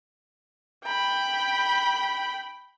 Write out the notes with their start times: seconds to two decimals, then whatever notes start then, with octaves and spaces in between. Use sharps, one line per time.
0.84 G5 B5